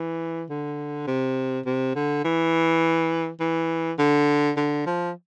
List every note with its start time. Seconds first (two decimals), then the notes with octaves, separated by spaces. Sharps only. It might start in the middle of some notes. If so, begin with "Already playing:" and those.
Already playing: E3
0.50 D3
1.07 C3
1.66 C3
1.95 D3
2.24 E3
3.40 E3
3.99 D3
4.57 D3
4.86 F3